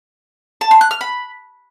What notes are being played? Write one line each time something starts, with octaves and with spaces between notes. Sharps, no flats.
A5
C6
F#6
F6
B5